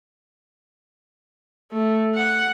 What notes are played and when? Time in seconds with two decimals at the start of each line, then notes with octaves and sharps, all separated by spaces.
1.72 A3
2.15 F#5